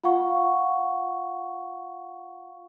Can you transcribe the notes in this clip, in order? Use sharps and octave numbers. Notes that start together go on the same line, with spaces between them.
F4 F5 F#5 C#6